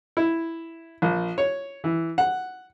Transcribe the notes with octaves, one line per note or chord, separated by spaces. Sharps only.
E4
A#1
C#5
E3
F#5